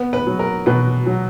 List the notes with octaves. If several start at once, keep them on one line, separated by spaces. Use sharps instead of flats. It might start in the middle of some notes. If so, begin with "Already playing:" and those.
Already playing: B3
B4
F#3
A#4
B2 B4
F#3